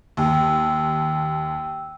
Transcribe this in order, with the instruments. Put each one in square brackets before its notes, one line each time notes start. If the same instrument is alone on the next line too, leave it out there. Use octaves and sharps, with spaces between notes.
[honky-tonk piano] D#2 [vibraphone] G5 E6